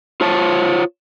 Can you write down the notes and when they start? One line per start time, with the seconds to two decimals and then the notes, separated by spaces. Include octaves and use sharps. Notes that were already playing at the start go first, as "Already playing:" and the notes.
0.21 F4 C5 C#5 A5